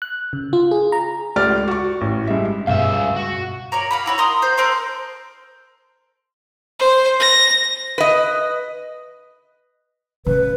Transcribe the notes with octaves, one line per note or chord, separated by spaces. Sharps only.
F#6
C#3
F4
G#4
A#5
C#2 A3 G4 D5 F6
F#4 C#6
A1
G2 G#3 E5
C#2 G2 B2 E5 F5
F#4
A#4 C#5 D5
F5 F#5 B5
E4 F#4 C#5
A#4 C6 D#6
C5
A4 A#4 C5 C6
C5
A#6
B4 D#5
C#3 B4